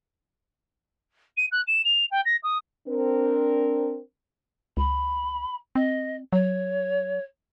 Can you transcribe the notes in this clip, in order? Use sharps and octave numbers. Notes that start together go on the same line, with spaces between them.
D#7
F#6
E7
F7
G5
A#6
D#6
C4 D4 A#4
C#2 B5
C4 D#5
F#3 C#5